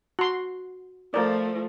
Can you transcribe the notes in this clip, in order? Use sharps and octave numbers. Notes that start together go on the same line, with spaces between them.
F#4 C6
F3 A3 F4 A#4 D5